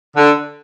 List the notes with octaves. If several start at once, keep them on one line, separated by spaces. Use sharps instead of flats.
D3